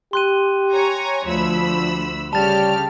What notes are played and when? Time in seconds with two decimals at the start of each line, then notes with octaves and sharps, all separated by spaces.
0.13 G4 C6 F#6 D#7
0.71 C#5 G#5 A#5
1.27 D2 F3 B5 E6
2.33 C#3 G3 G4 A5 F6 A6